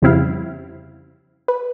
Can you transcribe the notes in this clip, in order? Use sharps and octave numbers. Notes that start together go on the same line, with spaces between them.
F2 C#3 G3 C4 E4 F5
B4